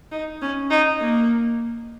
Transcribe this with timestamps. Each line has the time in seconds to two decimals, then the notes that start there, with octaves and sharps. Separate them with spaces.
0.12 D#4
0.41 C#4
0.71 D#4
1.01 A#3